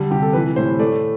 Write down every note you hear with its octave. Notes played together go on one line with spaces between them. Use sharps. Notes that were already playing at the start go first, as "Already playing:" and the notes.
Already playing: D3 G3
C3 G4
A4
E3 B4
A2 C5
A3 D5